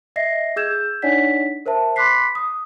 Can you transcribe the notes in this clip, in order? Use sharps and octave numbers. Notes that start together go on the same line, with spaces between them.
D#5 E5 A#6 C7
G#4 E6 G6 G#6 E7
D4 D#4 C#5 D5 F#5 B6
A#4 C5 E5 A5
B5 C6 D6 F#6 B6 C7
D#6